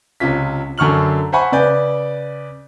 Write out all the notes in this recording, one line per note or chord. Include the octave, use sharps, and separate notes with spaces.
C#2 C3 C#4 F4 B6
F#2 D3 C#6 F6 F#7
C5 E5 F#5 G#5 B5 C#6
C#3 B4 D5 G#5 G6